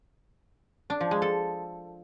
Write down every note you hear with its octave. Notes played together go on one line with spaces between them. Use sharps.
D4
F3
G#3
A4